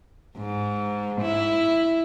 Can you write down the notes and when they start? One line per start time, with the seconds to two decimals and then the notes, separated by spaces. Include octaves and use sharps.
0.37 G#2
1.22 E4